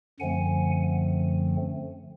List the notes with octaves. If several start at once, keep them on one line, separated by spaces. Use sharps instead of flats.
F#2 D3 F3 A3 C4 F#5 G#5